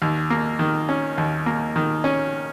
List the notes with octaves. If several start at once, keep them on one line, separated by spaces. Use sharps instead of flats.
D#2
A#3
D#3
C#4
D#2
A#3
D#3
C#4